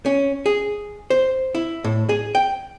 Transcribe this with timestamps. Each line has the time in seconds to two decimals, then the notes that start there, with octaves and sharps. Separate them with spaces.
0.06 C#4
0.46 G#4
1.10 C5
1.55 E4
1.84 A2
2.09 G#4
2.35 G5